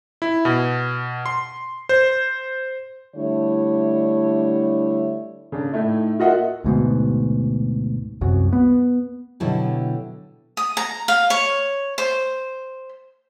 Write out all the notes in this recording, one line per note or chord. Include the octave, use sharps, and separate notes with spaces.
E4
B2
C6
C5
D3 G3 A3 D4 E4 C#5
C#3 D4
A2 A3 D#4 E4
A#3 F4 F#4 D#5 E5 F#5
D2 G#2 B2
C2 F#2 F#3
B3
B2 D3 F#3 E4 G4
D#6
A#5
F5
C#5
C5